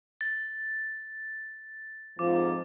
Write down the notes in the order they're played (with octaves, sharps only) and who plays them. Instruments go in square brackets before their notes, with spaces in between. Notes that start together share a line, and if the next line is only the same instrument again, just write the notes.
[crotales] A6
[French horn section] F2 G#2 F3 [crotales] D6